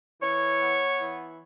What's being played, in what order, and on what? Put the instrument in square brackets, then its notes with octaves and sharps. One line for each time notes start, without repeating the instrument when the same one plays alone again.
[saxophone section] E3 C#5
B3
E3